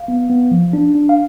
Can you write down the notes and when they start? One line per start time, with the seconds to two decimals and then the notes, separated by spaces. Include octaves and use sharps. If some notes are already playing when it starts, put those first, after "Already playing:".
Already playing: F5
0.08 B3
0.30 B3
0.51 F3
0.73 D4
0.95 D4
1.09 F5